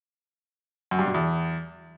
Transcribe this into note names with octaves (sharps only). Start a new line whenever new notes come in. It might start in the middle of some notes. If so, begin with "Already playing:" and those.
F#2
G2
B2
E2